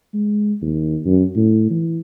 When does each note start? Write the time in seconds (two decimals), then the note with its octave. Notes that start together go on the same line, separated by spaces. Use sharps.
0.14 G#3
0.62 D#2
1.06 F#2
1.36 A2
1.70 E3